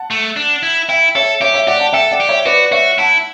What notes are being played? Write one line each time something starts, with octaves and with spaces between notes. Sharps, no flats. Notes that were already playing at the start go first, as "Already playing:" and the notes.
Already playing: F#5 A5
A3
D4
E4
E4 E5 G5
A4 C#5 E5
G4 C#5 E5
C#5 E5
G4 D5 F#5
F#5 A5
A4 E5 G5
D5 F#5
G4
C#5 E5
F#4 B4 D5
F#4 C#5 E5
E4 F#5 A5